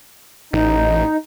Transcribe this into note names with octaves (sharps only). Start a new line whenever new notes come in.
A1 D#4